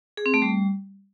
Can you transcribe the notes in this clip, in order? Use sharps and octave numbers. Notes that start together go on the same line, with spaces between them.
G#4
C4
A3
G3